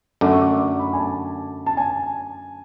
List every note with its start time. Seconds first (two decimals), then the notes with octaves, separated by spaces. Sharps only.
0.21 F#2 D3 A3 D6
0.32 C#6
0.41 D6
0.79 B5
0.93 G#5
0.99 A5
1.66 A5
1.77 G#5